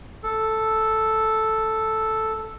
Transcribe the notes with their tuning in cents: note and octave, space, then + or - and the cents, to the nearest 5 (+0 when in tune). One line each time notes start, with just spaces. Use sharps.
A4 +0